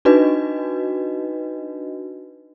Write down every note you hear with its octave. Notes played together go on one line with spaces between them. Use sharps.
D4 D#4 F#4 B4 D#5